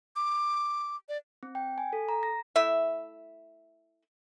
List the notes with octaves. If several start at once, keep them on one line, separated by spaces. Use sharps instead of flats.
D6
D5
C4
G5
G#5
A4
A#5
A#6
A3 E4 E5